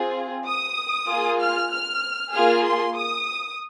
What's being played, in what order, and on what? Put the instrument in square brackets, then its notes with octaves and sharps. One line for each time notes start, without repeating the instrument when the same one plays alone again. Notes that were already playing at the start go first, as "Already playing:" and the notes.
Already playing: [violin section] C4 F4 G#4
D#6
A#3 F4 G#4
F6
F6
A#3 F4 G#4 F6
C6
D#6